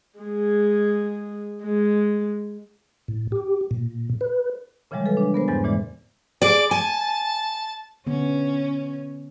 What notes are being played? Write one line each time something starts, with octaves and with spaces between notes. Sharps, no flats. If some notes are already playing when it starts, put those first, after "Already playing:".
G#3 G#4
G#3
A2
G4
A#2
B4
A#2 C#3 E3 F3 G3 G#3
A4 B4 G#5
D4
B3 A#4 C5
E2 G#2 A6
A#2 E3 G#3 D5
G#4 D5 D6
G#5 A5
D3 B3 C#4